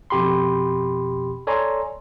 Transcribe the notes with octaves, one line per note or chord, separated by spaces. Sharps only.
F2 B2 G4 B5 C6
A4 C#5 D5 G#5 A#5 C6